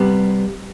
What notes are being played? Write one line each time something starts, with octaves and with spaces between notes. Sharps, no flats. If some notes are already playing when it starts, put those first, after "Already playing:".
Already playing: C3 G3 B3